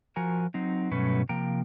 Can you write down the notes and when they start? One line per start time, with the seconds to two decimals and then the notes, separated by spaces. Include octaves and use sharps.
0.16 F3 F#4 A#4 G#5 A#5
0.54 F#3 C4 D#4
0.92 G2 B2 F#3 A3 C#4 B4
1.29 C3 F3 A#3 A#4 G5 A#5